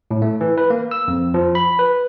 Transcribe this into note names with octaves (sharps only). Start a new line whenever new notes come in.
A2
A3
E3
B4
A#3
E6
F2
F3
B5
B4